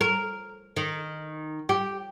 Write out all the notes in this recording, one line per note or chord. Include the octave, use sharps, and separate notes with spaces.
A#4
D#3
G4